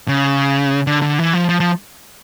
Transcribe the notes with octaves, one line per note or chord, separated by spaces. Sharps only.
C#3
D3
D3
E3
F3
F3
F3